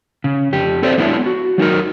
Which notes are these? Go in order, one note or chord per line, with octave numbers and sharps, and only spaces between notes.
C#3
F2 G4
C4 A4 C5 D5
F#3 B3 D4 E4
F#4
F#3 D#4 F#4 A#4